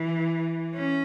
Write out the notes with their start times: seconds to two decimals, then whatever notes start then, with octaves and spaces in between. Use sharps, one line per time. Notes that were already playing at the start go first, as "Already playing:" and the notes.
Already playing: E3
0.74 C#4